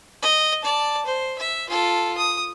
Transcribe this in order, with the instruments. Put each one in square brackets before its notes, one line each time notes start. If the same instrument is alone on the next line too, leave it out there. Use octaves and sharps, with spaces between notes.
[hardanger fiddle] D#5
D5 A5
C5
E5
F4 A4
D#6